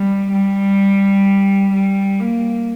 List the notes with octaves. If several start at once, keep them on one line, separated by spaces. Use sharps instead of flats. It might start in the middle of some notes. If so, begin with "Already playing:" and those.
Already playing: G3
G3
G3
A#3